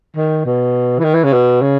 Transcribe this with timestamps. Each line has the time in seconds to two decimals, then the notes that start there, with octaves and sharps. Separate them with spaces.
0.16 D#3
0.45 B2
0.99 E3
1.04 D#3
1.14 E3
1.24 C#3
1.33 B2
1.62 C#3